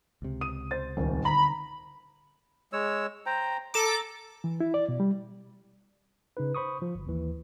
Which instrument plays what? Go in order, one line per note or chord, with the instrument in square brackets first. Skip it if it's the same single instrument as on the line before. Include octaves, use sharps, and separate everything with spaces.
[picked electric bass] C#2 C3
[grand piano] D#6 D#7
C5 A6
[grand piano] D#1 G#1 [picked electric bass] C#2 C4
[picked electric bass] D3 [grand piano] A#5 [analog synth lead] B5
[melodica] G#3 C#5 E6
C5 G5 A#5
[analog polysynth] A4 D6 [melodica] A#5
[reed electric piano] E3
E4
D5
B2
G3
[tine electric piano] C#3 D#4 B4
C5 B5 C#6 D#6
F3
G1
D#2 E3